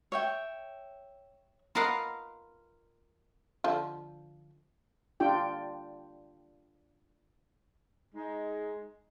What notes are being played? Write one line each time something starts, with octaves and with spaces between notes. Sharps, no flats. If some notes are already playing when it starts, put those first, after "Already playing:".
C#5 E5 G5
F4 A#4 B4 D#5 F5 F#5
D3 F3 F4
D4 F4 G4 G5
G#3 D#4